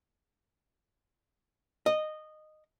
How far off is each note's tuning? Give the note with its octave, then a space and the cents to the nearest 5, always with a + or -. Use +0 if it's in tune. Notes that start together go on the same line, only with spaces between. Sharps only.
D#5 -15